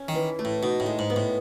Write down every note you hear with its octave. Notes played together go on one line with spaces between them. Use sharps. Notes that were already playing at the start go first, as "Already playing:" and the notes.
Already playing: C#4
D#3
E3
A3
A2
B2 D#4
A2
G#3
G#2
B3
A2